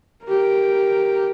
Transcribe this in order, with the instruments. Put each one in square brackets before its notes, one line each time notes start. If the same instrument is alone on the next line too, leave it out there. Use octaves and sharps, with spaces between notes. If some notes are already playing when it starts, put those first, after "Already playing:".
[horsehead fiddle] G4 A#4